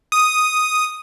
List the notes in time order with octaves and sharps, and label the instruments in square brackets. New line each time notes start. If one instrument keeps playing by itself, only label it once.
[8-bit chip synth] D#6